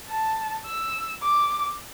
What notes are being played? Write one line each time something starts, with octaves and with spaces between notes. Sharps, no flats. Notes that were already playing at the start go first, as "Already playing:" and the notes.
A5
E6
D6